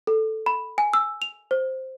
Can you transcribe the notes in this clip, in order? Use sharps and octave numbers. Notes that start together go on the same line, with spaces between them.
A4
B5
G#5
E6
F7
C5